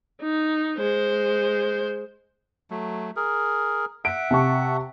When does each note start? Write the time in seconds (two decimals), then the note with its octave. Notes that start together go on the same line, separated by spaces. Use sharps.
0.22 D#4
0.78 G#3 C5
2.70 F#3 A3
3.16 G#4 A#4
4.05 E5 F#5 D7
4.31 C3 A5 C#6